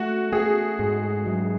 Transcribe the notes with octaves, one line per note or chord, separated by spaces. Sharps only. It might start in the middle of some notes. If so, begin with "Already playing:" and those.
Already playing: A3 F#4
A3 G#4
G#2
F#3